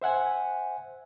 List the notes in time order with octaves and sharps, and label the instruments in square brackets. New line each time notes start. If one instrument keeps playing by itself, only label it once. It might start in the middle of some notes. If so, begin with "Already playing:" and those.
[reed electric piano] C5 E5 F#5 G#5